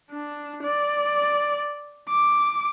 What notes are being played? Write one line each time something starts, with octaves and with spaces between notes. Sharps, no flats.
D4
D5
D6